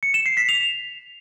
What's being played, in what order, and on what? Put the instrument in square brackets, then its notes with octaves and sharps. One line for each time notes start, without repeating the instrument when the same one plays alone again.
[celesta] C#7
E7
C7
B6
F7